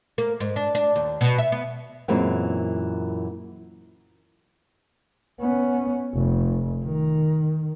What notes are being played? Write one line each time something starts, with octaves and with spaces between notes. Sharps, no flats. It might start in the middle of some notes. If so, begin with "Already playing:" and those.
A#3
G#2
D4
D4
D#2
B2
E5
B3
F#2 A#2 E3 G#3 A#3 C4
B3 C#4
F1
D#3